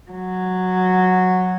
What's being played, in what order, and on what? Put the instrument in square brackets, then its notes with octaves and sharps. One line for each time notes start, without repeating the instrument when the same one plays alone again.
[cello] F#3